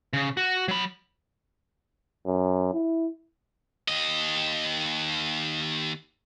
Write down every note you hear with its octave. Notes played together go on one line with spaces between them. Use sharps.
C#3
F#4
F#3 B5
F#2
E4
D#2 D#5